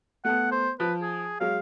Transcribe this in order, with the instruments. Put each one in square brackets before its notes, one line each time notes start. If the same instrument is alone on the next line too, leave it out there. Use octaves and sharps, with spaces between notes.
[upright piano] A3 B3 [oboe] F#5
[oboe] C5
[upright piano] F3 [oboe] B4
[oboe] G#4
[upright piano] F#3 G#3 [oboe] F5